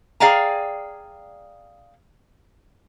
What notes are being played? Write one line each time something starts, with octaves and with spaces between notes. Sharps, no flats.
G#4 D5 F5 G5 G#5 A#5